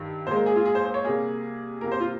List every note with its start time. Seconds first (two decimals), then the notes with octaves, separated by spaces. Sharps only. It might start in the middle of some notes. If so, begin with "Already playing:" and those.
Already playing: G2 D#3
0.27 A#2 G#3 C5
0.36 A#4
0.46 G#4
0.56 F4
0.65 G#4
0.75 C5
0.85 C5
0.94 C#5
1.04 C3 G3 A#3 G#4
1.81 C3 G3 A#3 A#4
1.92 C5
2.00 F4